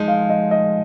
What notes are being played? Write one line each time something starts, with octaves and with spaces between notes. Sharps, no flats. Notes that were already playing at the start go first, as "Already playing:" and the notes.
Already playing: F3 G#3 D#4
F5
D#5
D#5